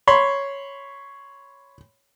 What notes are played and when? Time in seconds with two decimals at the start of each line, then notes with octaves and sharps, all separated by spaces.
0.07 C#5 B5 C6